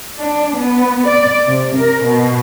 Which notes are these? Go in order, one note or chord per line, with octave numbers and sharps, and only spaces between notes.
D4
B3
D5
C3
A#4
B2